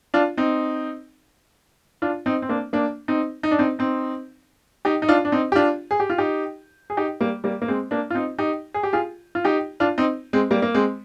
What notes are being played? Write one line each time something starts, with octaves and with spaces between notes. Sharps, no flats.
D4 F4
C4 D#4
D4 F4
C4 D#4
C4
A#3 D4
A#3 D4
C4 D#4
D#4
D4
C4 D#4
C4 D#4
D#4 G4
D#4
D4 F4
D4
C4 D#4
G4
D4 F4
G#4
G4
F4
D#4 G4
G#4
D#4 G4
G3 A#3
G3 A#3
A#3
G#3 C4
A#3 D4
F4
C4 D#4
D#4 G4
G#4
G4
F4 G#4
F4
D#4 G4
D4 F4
C4 D#4
G#3 C4
G3 A#3
A#3
G#3 C4